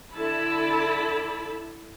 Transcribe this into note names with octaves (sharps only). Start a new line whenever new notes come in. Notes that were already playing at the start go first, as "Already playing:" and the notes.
D3 E4 A5 B5